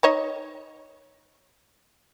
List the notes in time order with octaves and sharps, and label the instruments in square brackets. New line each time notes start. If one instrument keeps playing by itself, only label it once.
[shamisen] D#4 C#5 D#5